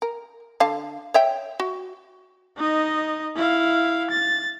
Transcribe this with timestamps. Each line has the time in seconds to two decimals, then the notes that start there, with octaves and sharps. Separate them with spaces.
0.02 A#4
0.60 D3 F5 A5
1.14 C#5 E5 G5
1.60 F#4
2.57 D#4 D#5
3.36 E4 F5
4.10 A6